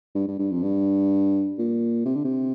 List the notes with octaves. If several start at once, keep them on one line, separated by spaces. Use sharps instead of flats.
G2
G2
G2
F2
G2
A#2
C3
D3
C3